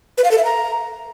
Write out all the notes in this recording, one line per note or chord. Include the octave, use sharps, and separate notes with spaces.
B4
F5
A4
E5
A#5